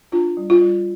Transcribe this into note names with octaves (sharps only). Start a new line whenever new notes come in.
D4 F4
G3
F4
G3